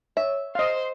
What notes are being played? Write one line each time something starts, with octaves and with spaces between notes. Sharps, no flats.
C#5 E5
C5 D#5 F5 C6